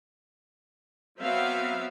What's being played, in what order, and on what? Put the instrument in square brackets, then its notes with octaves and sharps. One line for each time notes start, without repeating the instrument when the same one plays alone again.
[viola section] F#3 B3 C4 E5 F5